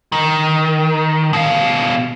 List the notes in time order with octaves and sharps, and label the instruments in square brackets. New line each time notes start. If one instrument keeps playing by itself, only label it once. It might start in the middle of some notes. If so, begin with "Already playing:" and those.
[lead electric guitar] D#3
B2 F5